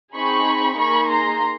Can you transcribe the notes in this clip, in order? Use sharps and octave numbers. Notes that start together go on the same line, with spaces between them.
C4 D#4 G#4 B5 C#6
A#3 D#4 G#4 B5 C#6
A#5 C6